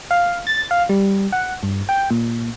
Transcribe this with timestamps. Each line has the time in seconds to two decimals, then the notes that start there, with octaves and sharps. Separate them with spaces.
0.11 F5
0.47 A6
0.71 F5
0.89 G3
1.32 F#5
1.63 G2
1.89 G5
2.10 A#2